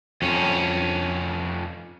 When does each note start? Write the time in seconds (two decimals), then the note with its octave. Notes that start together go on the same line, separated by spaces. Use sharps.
0.22 F2 C#4